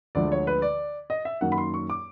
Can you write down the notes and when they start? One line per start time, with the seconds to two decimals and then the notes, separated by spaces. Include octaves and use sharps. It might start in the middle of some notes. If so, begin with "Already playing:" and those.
0.15 D2 D3 F3 G#3 D5
0.32 C#5
0.47 B4
0.62 D5
1.10 D#5
1.25 E5
1.41 F#2 D#3 F#3 A#3 F#5
1.52 B5
1.58 C6
1.74 C#6
1.90 D6